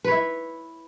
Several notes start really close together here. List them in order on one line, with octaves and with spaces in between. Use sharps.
B4 C#5 E4